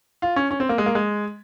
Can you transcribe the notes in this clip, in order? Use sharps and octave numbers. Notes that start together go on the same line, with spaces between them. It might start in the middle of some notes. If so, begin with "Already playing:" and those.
F4
C#4
C#4
C4
A#3
G#3
A#3
G#3